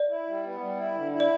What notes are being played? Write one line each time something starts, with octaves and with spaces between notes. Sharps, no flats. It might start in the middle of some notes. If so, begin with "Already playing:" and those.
Already playing: D5
E4
G3
B3
G3
E4
D3
E4
D5